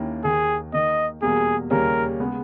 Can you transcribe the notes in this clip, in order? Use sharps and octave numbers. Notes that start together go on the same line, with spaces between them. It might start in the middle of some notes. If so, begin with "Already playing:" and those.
Already playing: D#2 D#3 A#3 C#4 E4
D#2 D#3 A#3 G#4
D#3 A#3 D#4 D#5
E2 B2 G3 A#3 G#4
D#2 C#3 G3 A#3 C#4 A#4
C#3 G#3 B3